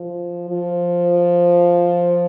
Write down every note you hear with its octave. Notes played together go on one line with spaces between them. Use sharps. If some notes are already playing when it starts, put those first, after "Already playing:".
Already playing: F3
F3